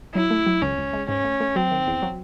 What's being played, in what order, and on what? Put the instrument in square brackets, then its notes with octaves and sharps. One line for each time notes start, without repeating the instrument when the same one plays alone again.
[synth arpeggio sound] F#3 [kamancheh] E4
[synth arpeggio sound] A3
F#3
[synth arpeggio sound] C#2 [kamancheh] C#4
[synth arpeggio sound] C#2
G#3
[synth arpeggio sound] G#2 [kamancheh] C#4
[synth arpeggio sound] A3
A3
[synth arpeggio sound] F#3 [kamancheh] C4
[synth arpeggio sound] D#3
E2
F#3